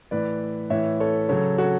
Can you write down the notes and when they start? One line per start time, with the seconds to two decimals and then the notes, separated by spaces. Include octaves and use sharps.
0.11 A2 E3 B4 D5
0.70 A2 E3 C#5 E5
1.00 A4 C#5
1.29 C#3 F#3 A4 C#5
1.58 F#4 A4